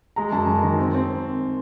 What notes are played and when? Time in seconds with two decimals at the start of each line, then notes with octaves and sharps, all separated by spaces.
0.16 G#3 A#5
0.32 F#2 A5
0.47 F#2
0.63 D#3
0.78 C4
0.94 C4